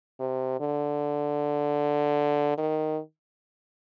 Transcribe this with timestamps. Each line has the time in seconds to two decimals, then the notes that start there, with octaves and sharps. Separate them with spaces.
0.20 C3
0.60 D3
2.58 D#3